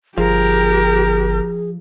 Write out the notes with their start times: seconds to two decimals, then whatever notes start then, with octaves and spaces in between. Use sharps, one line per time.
0.18 G1 F3 G4 G#4 A#4